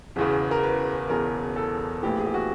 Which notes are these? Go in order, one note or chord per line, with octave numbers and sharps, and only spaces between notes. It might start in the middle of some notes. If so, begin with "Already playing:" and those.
E1 E2 C#3
A#4
B4
E1 E2 C#3 A#4
A4
A#1 A2 E3 G4
G#4
G4
F#4